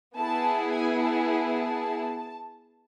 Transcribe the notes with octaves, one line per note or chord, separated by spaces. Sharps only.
B3 E4 G#4 A5
G#5
A5